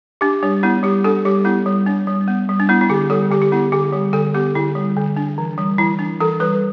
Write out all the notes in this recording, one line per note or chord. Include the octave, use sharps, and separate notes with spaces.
D4 G4
G3 D4
B3 E4
G3 G4
D4 A4
G3 G4
B3 E4
G3
D4
G3
B3
G3
D4
B3 E4
E4
D3 G4
G3 A4
D3 G4
G4
B3 E4
D3 G4
G3
D3 A4
B3 G4
D3 E4
G3
D3
D4
E3
G3
E3 E4
D4
E3 A4
G3 B4